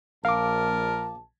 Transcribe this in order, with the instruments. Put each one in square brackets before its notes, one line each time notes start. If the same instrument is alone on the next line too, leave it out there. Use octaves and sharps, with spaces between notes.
[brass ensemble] A#1 A5 [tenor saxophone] A#4 [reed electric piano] F5 D6